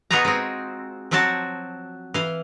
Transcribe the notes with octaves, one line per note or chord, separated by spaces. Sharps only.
B3 D#4 F4 F#4 G#4 A#5
G#3 C4
F3 F#3 C4 F#4 A5
E3 F5